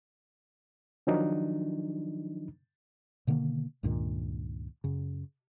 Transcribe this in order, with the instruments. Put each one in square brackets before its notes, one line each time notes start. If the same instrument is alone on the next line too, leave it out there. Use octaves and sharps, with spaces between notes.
[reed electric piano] D#3 F3 F#3 D4 D#4
[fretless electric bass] B2 D3 D#3 A#3
C#2 G2 A#2 D#3
F#2 C#3